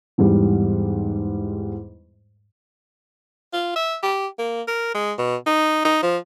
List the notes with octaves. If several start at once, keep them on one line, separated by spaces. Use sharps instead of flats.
E2 G#2 G3
F4
E5
G4
A#3
A#4
G#3
B2
D#4
D#4
F3